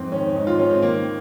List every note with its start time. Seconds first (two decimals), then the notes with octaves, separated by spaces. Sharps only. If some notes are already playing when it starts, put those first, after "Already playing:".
Already playing: F2 G#2 C4
0.12 D#3 C#4
0.35 G#2 D#4
0.47 F4
0.59 G#2 C#4
0.71 C4
0.82 D#3 A#3